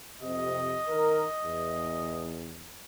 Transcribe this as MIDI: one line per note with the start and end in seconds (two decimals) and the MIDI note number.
0.21 0.78 41
0.21 0.78 48
0.21 2.37 75
0.87 1.23 51
0.87 1.23 70
1.43 2.70 40